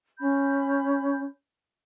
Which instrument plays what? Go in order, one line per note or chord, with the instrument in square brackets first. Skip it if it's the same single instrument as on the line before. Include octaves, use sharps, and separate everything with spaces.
[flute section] C#4 B5 G6